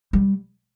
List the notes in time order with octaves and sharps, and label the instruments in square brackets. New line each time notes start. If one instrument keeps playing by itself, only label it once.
[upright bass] G3